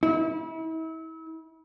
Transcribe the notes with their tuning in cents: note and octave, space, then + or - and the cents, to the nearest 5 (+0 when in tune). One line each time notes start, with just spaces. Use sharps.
E4 -35